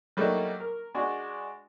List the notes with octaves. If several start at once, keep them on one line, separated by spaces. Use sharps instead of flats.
F#3 G3 A3 A#3 D4 D#4
A#4
G#3 D4 F#4